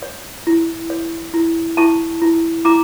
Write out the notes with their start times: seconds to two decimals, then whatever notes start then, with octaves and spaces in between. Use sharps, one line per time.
0.02 C#5
0.47 E4
0.90 C#5
1.34 E4
1.77 E4 A5 C#6
2.22 E4
2.65 E4 A#5 D6